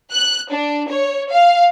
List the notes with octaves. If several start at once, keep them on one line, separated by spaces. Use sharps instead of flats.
F#6
D4
C#5
F5